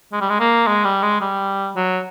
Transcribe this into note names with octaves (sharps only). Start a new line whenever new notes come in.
G#3
G3
G#3
A#3
G#3
G3
G#3
G3
F#3